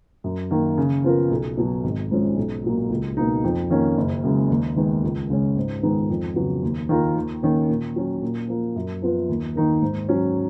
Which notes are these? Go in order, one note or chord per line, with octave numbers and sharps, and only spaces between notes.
F#2
D#3 A#3
C#3
F3 B3 F4 A#4
B1
B2 F#3
G#1
G#2 F3 G#3 C#4
B1
A#2 F#3 A#3
C#2
B2 A#3 D#4
F2
D#3 A#3 C#4
F#1
F#2 C#3 G#3
D#2
D#3 G#3 B3
C#2
C#3 G#3 C#4
G#2
D#3 G#3 B3 D#4
F2
C#3 F#3 B3
D#2
D#3 A#3 F4 A#4
D#2
D#3 A#3 C#4
A#2
F#3 C#4
A#2
F3 A#3
F#2
F3 B3 F4 B4
D#2
D#3 A#3 D#4 A#4
G#2
F#3 C#4